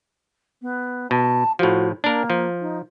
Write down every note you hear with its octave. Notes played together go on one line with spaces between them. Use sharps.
B3
B2 A5
A2 F3 F#4
A#3 D4 A#4
F3
D#4